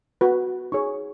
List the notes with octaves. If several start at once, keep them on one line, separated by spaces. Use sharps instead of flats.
F#4 B4
D#4 G#4 C#5 C#6